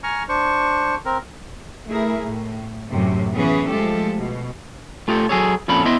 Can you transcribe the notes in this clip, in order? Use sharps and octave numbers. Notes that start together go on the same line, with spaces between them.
G#5 A#5 C#6 F6
D4 C5 C#6
C4 A#4
A3 E4 G#4 A#4
A2
F#2 A2 C3
E3 B3 C#4 G#4 B4
F3 G#3 A3 G4 A4
B2
A3 F4 G4 A4
F#3 G#4 A4 C#5
F2 A#2 C#4 A4 F5 B5
B3 E4 D#5 E5 C6